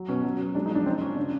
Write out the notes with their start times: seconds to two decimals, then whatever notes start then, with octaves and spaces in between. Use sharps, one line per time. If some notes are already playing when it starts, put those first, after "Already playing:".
Already playing: F#3
0.09 B2 C#4
0.24 F#3
0.39 F#3
0.55 G#3 D4
0.66 D#4
0.70 F3
0.75 D4
0.86 C#3 C4
1.01 C#3 C#4
1.17 C#3 D4